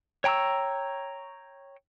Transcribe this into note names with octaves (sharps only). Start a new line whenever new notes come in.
C#5 G5 A#5 C#6 E6